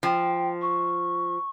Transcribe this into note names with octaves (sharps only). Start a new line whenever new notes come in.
F3 G5
C#6